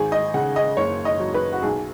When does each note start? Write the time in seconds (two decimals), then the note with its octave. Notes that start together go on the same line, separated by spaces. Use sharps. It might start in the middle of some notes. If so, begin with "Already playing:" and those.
Already playing: G#1 G#4
0.12 D#5
0.34 C#3 F#5
0.56 D#5
0.77 F#1 C#5
1.05 D#5
1.20 F#3
1.34 B4
1.53 F#4
1.63 B1 G#4